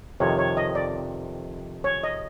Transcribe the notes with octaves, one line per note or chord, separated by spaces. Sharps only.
F2 C3 D#3 C#5
C#5
D#5
D5
C#5
D#5